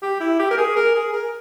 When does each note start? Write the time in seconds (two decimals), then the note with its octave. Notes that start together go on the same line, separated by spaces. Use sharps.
0.02 G4
0.20 E4
0.39 G4
0.51 A#4
0.58 G#4
0.76 A#4
0.95 G#4
1.13 A#4